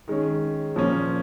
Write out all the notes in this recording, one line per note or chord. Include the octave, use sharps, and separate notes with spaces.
D#3 G#3 C#4
A#2 F3 A#3 C#4